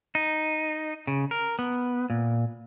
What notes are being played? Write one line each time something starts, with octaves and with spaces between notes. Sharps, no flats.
D#4
C#3
A#4
B3
A#2